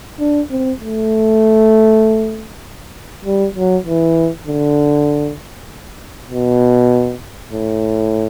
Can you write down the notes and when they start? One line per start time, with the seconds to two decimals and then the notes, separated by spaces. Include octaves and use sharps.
0.20 D4
0.51 C4
0.80 A3
3.25 G3
3.56 F#3
3.86 E3
4.47 D3
6.30 B2
7.53 A2